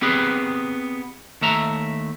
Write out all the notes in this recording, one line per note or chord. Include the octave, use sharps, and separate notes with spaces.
B3 C4 G4 G#4 B4
D#2 A3 E5 A#5